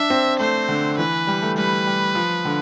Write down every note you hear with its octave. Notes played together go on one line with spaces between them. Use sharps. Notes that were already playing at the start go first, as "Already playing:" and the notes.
Already playing: D4 E5
C4
A3 C5
D3
E3 B4
G3
A3
G3 B4
G3
F3
D3